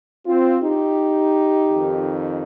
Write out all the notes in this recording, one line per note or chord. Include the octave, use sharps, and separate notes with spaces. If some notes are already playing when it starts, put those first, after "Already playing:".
C4 F4
D#4 G4
F2 D#3